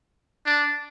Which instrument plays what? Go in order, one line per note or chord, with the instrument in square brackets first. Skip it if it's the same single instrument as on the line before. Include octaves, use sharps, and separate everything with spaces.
[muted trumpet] D4